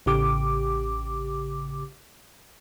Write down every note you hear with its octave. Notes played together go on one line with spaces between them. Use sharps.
A1 C#3 G4 D6